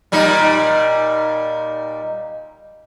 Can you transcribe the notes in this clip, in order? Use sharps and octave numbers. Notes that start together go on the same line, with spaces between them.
A#2 G3 D#4